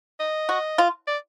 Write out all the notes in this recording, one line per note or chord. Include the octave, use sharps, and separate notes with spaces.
D#5
F#4
F4
D5